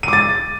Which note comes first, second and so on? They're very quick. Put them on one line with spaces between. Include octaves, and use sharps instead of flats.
D#7 D6 A6